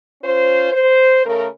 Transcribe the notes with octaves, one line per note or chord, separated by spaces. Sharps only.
C#4 F4 C5
C5
C#3 A3 A#4